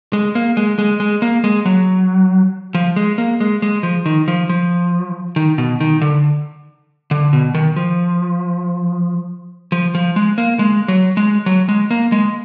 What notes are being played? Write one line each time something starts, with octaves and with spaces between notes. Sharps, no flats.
G#3
A#3
G#3
G#3
G#3
A#3
G#3
F#3
F3
G#3
A#3
G#3
G#3
F3
D#3
F3
F3
D#3
B2
D#3
D3
D3
B2
D#3
F3
F3
F3
G#3
A#3
G#3
F#3
G#3
F#3
G#3
A#3
G#3